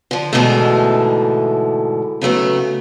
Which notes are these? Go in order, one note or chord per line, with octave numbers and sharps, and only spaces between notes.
D3 F3
G#2 B2 D3 E3 G#3 A3
C#3 F#3 A3 B3